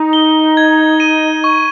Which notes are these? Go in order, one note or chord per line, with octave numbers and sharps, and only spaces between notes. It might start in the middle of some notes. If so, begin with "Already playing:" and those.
Already playing: D#4
G7
G#6
D#7
C#6